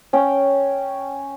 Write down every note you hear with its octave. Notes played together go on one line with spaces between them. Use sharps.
C#4 G5